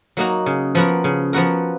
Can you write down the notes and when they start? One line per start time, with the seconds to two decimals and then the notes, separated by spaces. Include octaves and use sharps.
0.17 F#3 A#3 D#4 F#4
0.46 C#3
0.75 F3 B3 F#4 A#4
1.04 C#3
1.33 F3 B3 F#4 A#4